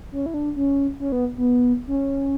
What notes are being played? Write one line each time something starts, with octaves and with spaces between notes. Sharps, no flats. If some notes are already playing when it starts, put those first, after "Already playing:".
C#4
E4
D4
C#4
C#4
B3
B3
C#4